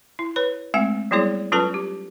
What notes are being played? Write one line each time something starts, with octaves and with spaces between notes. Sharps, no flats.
E4
B4 C#5 B5
G#3 A3 C4 F#5 G#5
F#3 G3 B3 E4 G#4 C#5
F#3 C#4 F4 A4 B4 A5
G4